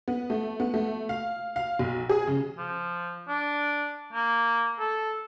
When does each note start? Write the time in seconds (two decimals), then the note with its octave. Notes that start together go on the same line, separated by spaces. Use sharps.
0.08 B3
0.30 A3
0.60 B3
0.74 A3
1.09 F5
1.56 F5
1.79 B1
2.09 G#4
2.27 C#3
2.58 F3
3.28 D4
4.13 A#3
4.80 A4